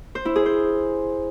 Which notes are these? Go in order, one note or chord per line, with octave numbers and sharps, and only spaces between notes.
C5
E4
G#4
C5